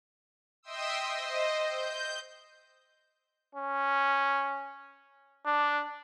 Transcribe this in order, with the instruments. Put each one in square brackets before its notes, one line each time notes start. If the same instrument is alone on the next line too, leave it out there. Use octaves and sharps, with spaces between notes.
[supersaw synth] D#5 E5 G5 C6 D#6 E6
C5 D#5
G6
[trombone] C#4
D4